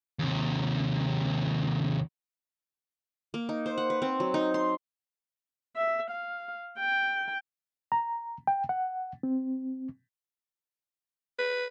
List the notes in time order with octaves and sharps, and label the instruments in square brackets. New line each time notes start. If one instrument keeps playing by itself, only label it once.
[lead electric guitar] D#2 C3
[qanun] A#3
D#4
C5
F#5
B4
C4
F#3
D#4
C6
[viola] E5
F5
G5
[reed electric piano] A#5
G5
F#5
C4
[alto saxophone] B4